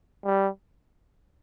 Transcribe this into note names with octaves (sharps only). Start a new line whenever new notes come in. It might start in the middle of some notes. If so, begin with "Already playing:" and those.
G3